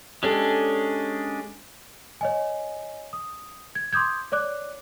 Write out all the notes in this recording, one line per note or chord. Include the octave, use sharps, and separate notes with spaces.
G#3 C#4 D4 G4 A4
C#5 D#5 G#5
D#6
G#6
C6 D6 D#6 G6 G#6
C#5 D5 D6 F#6